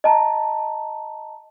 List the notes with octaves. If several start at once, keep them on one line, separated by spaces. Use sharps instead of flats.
D#5 A5 A#5